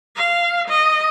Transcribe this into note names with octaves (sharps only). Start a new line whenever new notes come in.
F5
D#5